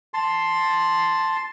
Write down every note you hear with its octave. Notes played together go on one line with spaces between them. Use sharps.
A5 C6